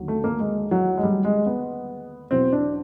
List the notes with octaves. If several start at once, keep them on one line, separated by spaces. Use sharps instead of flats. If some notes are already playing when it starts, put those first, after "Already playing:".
Already playing: D#2 D3 F#3
A3
A#3
G#3
F#3
G#3
G3
G#3
B3
E2 B2 F#3 C4
D4